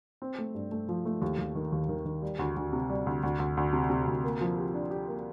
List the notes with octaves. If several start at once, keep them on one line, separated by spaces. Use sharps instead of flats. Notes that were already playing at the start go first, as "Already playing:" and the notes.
C4
A3
G2
A3
F3
A3
D#2
D#2
D#3
D#2
D#3
D#3
G3
D2
D2
C3
G3
D2
D2
D2
D2
C3
C3
D2
A#3
F3
G4
D4
G4
A#3